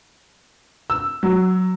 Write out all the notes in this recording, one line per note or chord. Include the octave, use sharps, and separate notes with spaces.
E6
F#3